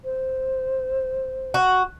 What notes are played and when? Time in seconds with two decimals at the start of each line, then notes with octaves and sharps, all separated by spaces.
0.04 C5
1.54 F#4